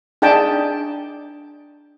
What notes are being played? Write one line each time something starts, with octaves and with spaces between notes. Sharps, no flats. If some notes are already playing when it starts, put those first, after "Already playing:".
D4 D#4 G#4 G5 A5